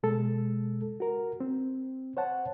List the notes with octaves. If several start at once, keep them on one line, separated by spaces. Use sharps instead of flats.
B2 G#3 A4
F#4 A#4
C4
C5 C#5 F#5 A5